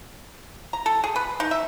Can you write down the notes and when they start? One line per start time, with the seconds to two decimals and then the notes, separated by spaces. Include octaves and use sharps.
0.73 A#5
0.86 A4
1.04 G#4
1.16 B4
1.40 D#4
1.51 E5